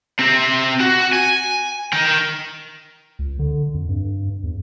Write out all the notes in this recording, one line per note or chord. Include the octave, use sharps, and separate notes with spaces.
C3 C4
F#4
G#5
A#4 G5
C#2
D3
F2
G2
E2